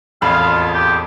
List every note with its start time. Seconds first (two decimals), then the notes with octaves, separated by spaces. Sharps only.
0.22 E1 A1 F2 F4 F5 B5
0.73 G4